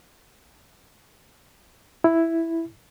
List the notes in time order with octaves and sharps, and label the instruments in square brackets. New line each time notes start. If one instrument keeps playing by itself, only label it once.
[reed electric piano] E4